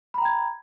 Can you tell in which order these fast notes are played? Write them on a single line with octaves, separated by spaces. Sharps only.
B5 A#5 G5 G#6